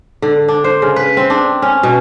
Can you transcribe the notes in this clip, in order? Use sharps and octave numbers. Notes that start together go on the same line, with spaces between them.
D3
D4
C5
C#3
B4
C4
D4
C#4
B2